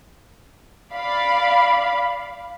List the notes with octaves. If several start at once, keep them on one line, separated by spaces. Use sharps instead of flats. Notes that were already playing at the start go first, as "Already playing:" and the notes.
D5 F5 B5